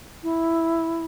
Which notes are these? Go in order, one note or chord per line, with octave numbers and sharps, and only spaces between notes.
E4